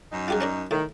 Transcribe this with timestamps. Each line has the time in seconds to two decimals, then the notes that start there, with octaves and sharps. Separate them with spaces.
0.12 F#2 D#4
0.28 F4 G4 G#4
0.41 C#4 D4 A#4
0.71 A2 D#3